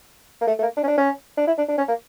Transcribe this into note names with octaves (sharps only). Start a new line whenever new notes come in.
A#3
A3
A3
A#3
D4
C#4
D4
C#4
D4
E4
D4
D4
C#4
A#3